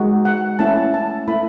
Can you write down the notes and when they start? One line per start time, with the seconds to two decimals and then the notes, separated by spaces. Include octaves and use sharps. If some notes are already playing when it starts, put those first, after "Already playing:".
Already playing: G#3 D#4 F#4
0.25 F#5
0.59 A3 C#4 E4 A5
0.94 A5
1.28 A3 E4 B5